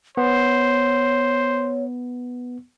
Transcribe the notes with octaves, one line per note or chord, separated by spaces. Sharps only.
B3 C5 C#5